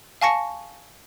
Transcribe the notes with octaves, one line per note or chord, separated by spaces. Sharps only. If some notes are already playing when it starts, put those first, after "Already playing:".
F5 G#5 A5 C#6 A#6 C#7